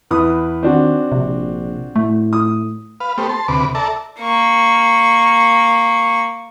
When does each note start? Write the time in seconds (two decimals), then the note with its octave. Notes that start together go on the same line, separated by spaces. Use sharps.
0.11 E2 B4 D#6
0.63 D#3 C4 D4 F#4
1.12 A#1 C3
1.96 A2 A3
2.33 D#6
3.00 B4 F5
3.18 A3 B3 G4 C5
3.29 A5 C6
3.48 D2 C3 B4 D6
3.75 A4 D5 E5 A5 A#5
4.20 A#3 C#6